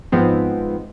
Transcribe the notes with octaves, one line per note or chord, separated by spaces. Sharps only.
G#2 F3 G#3 B3 C4